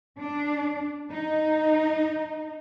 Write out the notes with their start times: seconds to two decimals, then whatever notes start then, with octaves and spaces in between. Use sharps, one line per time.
0.19 D4
1.11 D#4